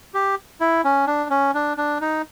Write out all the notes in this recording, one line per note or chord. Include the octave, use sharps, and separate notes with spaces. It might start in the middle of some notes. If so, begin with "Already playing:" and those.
G4
E4
C#4
D4
C#4
D4
D4
D#4